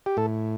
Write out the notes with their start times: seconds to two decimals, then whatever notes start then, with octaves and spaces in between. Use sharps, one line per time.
0.06 G4
0.17 A2 A4